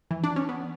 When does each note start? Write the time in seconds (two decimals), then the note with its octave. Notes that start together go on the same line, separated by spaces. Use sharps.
0.11 E3
0.24 D4
0.36 C#4
0.49 B3